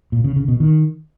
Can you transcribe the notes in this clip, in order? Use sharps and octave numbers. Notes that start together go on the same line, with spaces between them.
A#2
C#3
C#3
B2
D#3